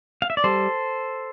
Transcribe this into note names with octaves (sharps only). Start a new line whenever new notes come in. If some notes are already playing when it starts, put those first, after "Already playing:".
F5
E5
D5
G3 A4 C5